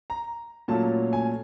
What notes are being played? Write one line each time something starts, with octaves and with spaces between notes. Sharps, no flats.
A#5
A#2 F#3 A3 C#4 F4 A5
G#5